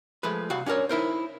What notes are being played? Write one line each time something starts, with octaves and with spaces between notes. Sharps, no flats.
F3 G#3 A3 B4
C2 F#4 F5 F#5
C#4 D4 F#4 A#4 C#5
D#4 E4 A#4 C5